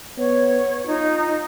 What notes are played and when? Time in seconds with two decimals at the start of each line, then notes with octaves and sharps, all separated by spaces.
0.18 B3 C#5
0.86 D#4 F4